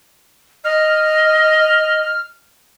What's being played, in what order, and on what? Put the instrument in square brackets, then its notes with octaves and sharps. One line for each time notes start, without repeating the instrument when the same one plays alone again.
[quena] D#5 [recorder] F6